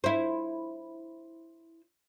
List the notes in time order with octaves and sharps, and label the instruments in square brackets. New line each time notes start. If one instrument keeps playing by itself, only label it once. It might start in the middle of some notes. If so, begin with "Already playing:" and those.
[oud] E4 C5